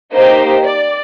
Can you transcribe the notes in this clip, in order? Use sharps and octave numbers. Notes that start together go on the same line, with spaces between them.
A#3 D#4 G4 C5
D5